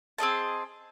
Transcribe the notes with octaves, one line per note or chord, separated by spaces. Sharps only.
C4 G#4 D#5 A5